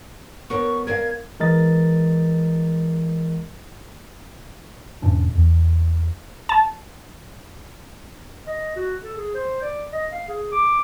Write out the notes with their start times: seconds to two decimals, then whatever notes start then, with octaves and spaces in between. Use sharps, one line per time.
0.50 B3 A#4 C#5 C#6
0.87 A#4 D5 F5 G#6
1.40 E3 G#3 A#4 D#5 A6
5.02 E1 G#2 C#4 D4
5.35 E2
6.49 A5
8.47 D#5
8.76 F#4
9.02 A4
9.16 G#4
9.34 C5
9.62 D5
9.92 D#5
10.12 F5
10.28 G#4
10.52 D6